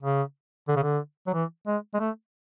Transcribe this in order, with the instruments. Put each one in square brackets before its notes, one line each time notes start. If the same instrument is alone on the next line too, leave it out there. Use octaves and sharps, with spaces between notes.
[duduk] C#3
D3
C#3
D3
F#3
E3
G#3
G#3
A3